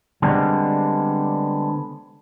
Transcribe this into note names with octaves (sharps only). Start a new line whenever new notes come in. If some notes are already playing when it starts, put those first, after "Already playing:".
D3 G3 G#3 B3 C4 D4